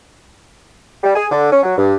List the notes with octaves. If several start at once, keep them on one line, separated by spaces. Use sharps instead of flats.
G3
G#4
D3
C#4
F#3
G2